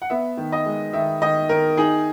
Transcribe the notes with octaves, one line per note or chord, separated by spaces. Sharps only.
F#5
B3 E5
D#3
D#5
G#3
D#3 E5
D#3 D#5
D#3 A#4
D#4 G#4